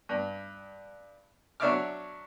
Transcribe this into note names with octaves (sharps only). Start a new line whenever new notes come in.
G2
F#3 D4 C#5 E5 D6 F6